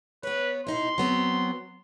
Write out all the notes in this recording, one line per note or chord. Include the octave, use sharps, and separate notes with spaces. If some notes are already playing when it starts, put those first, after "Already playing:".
B3 B4 C#5
B2 D#4 E4 C6
F#3 B3 C4